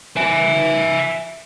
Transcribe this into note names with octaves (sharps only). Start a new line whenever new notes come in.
E5 G#5